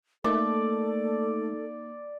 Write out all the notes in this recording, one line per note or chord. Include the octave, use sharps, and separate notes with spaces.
A3 A#3 D#4 A4 D5